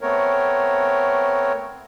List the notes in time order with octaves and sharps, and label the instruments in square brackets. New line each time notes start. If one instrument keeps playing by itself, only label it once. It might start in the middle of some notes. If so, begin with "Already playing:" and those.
[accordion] A3 B3 C4 A#4 C#5